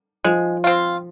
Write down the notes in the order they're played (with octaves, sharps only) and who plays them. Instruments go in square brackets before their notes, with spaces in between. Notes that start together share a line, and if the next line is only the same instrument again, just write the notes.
[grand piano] F3 [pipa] G#3
[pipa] C4 F4